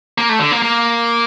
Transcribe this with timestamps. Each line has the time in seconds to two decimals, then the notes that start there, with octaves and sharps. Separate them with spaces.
0.18 A#3
0.29 A3
0.40 D3
0.51 A#3
0.62 A#3